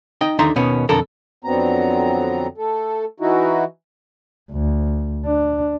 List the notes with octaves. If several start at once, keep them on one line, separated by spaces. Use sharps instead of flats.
D#4 D#5 G5
D#2 D3 D#4 E5 A#5 C6
D#2 B2 D#3 B3 C#4
B1 F2 D3 A4 A#4
F2 D3 F#3 B3 C4 A#5
A3 A4
E3 D#4 E4 F#4
D2
D4